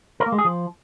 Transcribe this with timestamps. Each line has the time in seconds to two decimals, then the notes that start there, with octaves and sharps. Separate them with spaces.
0.20 A#4
0.26 A#3
0.32 G#3
0.38 G#4
0.45 F3